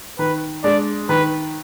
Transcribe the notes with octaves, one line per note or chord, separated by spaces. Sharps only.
D#3 B4
G#3 D4 D5
D#3 B4